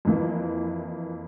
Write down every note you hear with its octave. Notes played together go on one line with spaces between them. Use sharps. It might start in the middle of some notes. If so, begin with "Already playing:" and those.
F2 E3 A#3